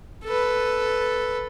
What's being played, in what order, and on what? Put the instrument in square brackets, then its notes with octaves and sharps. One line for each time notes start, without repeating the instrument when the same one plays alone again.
[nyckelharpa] A4 B4